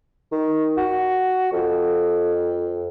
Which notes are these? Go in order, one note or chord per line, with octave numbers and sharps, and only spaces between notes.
D#3
F#4
F2